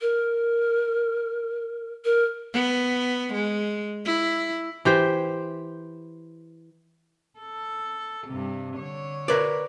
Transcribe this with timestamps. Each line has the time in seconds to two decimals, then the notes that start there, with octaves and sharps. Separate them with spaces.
0.01 A#4
2.05 A#4
2.54 B3
3.33 G#3
4.05 E4
4.85 E3 G4 C5
7.39 A4
8.27 G2 C3
8.77 D3 C#5
9.28 A#4 B4 D5